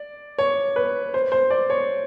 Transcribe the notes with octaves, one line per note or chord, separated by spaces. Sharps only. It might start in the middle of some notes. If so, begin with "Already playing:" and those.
Already playing: D5
C#5
B4
C5
C5
D5
C#5